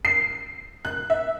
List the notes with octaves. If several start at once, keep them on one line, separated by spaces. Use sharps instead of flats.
C7
F#6
E5